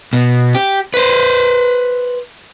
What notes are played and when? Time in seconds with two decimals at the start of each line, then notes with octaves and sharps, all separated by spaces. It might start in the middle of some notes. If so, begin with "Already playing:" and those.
0.13 B2
0.55 G4
0.94 B4 C5